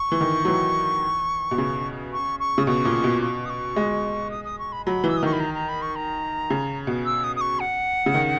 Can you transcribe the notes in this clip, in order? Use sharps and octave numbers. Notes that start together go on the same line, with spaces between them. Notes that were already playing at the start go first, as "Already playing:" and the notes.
Already playing: C#6
E3
D#3
F#3
E3
B2
C#3
C#6
C#6
C#3
B2 C#6
A#2
B2
C#6
D#6
C#6
G#3
D#6
D#6
C#6
B5
F#3 B5
E3
E6
D#6
D#3 C#6
B5
A#5
A#5
B5
C#6
A#5
C#3
B2
E6
D#6
D#6
C#6
F#5
C#3
D#3